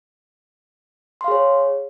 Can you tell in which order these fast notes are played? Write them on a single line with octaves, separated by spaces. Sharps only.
C6 F5 G#4 C#5